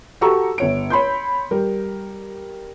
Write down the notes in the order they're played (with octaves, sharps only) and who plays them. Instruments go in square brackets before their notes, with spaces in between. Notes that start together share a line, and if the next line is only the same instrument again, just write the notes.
[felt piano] F#4 G4 A4 A#5 C#6 E6
G1 C#5 D7
C#5 B5 C6 G6
G3 A#4